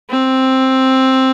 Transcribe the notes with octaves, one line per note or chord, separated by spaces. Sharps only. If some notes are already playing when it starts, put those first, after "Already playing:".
C4